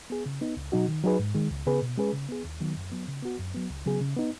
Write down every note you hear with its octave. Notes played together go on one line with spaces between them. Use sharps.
B3 G#4
C#3
B3 D#4
C#2
B2 F#3 D#4 F#4
D#3
F#3 D#4 G#4 B4
G#2
D#3 G#3
C#2
C#3 B3 G#4 B4
B2
G#3 C#4 G#4 B4
C#3
B3 G#4
D#2
D#3 F#3 B3
F#2
F#3 B3
C#3
B3 F#4
F#2
F#3 B3
C#2
C#3 F#3 B3 G#4
C#3
B3 D#4